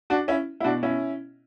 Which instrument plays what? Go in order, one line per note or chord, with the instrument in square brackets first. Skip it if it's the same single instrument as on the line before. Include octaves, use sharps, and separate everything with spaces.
[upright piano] D4 F#4
C#4 E4
E4
B2 D4 F#4
C#4 E4